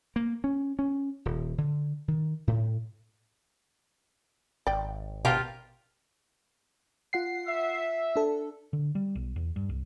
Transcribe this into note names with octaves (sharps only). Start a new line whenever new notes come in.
A#3
C#4
C#4
D#1
D3
D#3
A2
G#1 D5 G5
B2 B3 D4 F4 G4 A#4 F5
F4 F#5 C7
E5
D4 A4
D3
G3
B1
E2
G2
C2